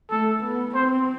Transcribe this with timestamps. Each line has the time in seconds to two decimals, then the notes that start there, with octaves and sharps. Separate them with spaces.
0.11 A3 A4
0.43 B3
0.74 C4 C5